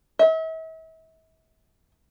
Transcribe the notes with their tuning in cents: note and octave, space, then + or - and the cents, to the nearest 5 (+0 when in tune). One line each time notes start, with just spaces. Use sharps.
E5 -40